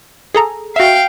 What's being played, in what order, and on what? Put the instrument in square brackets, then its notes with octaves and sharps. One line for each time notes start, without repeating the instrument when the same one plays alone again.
[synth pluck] G#4 A4 A#5
[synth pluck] F#4 E5 [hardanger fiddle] F5 G5